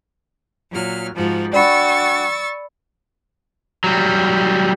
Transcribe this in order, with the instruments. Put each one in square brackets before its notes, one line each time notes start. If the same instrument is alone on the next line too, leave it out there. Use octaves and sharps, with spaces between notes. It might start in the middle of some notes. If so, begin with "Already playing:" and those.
[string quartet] A#2 F#3 F6
G#2 F3 F#4
[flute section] D4 F#4 G5 [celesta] D5 B5 [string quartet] C#6 E6 A6
[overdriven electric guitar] F#3 G3